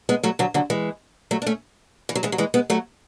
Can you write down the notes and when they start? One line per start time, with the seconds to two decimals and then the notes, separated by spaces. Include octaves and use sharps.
0.09 G#3 B3
0.23 F#3 A3
0.39 D3 F#3
0.54 D3 F#3
0.70 E3 G#3
1.31 F#3 A3
1.42 D4
1.47 A3 C#4
2.09 E3
2.15 F#3
2.23 E3 G#3
2.32 F#3
2.38 E3 G#3
2.54 G#3 B3
2.70 F#3 A3